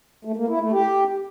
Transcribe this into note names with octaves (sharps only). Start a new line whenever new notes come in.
A3
A#3
E4
A3
G4